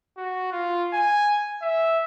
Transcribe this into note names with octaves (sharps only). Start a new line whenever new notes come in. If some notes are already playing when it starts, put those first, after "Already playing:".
F#4
F4
G#5
E5